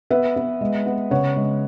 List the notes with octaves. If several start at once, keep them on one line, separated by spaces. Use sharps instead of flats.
B3 B4 E5
B3
G#3
B3
C#3 C#5 F#5
G#3